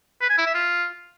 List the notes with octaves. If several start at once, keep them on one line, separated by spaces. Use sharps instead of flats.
B4
G#5
E4
E5
F4